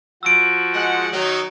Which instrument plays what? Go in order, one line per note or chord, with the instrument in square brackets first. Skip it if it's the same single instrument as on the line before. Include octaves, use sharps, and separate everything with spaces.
[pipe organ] F3 F#4 [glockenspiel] E6 D7
[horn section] G#3 F#5
D#3 F#3 D#4